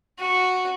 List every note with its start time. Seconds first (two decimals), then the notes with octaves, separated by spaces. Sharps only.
0.19 F#4